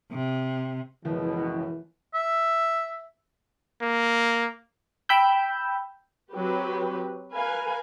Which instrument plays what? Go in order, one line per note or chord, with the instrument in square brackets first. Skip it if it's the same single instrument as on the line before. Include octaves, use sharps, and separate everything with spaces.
[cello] C3
[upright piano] F#1 F3 [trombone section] C#2 B2 [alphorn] E3
[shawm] E5
[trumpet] A#3
[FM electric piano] G5 B5 E6 G6
[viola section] F#3 C4 G4 B4
A#4 B4 F5 G#5